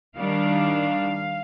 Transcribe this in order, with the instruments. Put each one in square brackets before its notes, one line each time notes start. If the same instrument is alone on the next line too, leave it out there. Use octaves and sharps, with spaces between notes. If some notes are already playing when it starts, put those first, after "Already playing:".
[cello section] D#3 G3 D4 F5